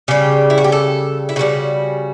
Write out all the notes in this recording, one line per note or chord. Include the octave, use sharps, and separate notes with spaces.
C#3 G3 G4
E4
F#4
G4
A4
E4
C#3 E3 G3 F#4